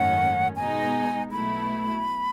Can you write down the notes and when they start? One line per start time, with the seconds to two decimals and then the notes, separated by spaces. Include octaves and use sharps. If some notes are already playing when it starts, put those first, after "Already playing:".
Already playing: G#1 F#2 D#3 A3 C#4 F#5
0.56 B2 G#3 D#4 G#5
1.31 B1 B2 A3 E4 B5